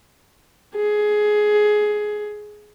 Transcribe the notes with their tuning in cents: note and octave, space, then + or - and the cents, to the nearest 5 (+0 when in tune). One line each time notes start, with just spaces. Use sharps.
G#4 +15